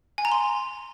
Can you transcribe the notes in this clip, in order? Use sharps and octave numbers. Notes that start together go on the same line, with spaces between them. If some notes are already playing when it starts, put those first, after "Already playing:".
G#5
A#5
C6